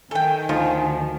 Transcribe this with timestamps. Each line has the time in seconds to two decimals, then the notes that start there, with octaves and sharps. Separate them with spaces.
0.11 D#3 A4 G5 G#5
0.49 D2 F3 D#4 F4